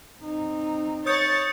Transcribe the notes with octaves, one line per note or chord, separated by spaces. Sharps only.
C4 D#4
C#5 D#6 G6 A6 C#7